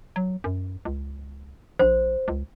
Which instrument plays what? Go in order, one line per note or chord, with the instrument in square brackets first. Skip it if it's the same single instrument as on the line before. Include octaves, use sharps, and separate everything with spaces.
[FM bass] F#3
F#2
C#2
[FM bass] A#1 [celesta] C5
[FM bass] C#2